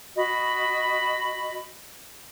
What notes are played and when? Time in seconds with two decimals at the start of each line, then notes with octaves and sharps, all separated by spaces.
0.17 F#4 D#5 B5